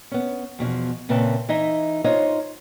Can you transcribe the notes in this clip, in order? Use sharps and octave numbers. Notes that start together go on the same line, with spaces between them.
B3 C#4
E2 B2 E3 F3
A#2 C#3 C4 B4 E5 A5
E3 D#4 D#5 E5
D#4 F4 C5 C#5 D#5